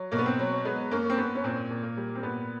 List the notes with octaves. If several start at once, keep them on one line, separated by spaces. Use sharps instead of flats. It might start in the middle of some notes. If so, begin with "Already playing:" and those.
Already playing: F#3
B2 A#3
B3
C4
F#3
G#3 B3
F#2 A#3
C4
F#2 B3
C#4
A#2 C4
A#2
A#3
G3
C4
A#2 B3